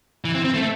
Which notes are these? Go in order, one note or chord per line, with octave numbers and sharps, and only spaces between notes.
E3
C4
C4
A3